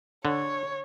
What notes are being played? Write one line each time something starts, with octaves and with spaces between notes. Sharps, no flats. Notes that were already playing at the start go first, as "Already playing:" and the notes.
D3 C#5